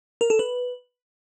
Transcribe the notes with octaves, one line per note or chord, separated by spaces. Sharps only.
A#4
A4
B4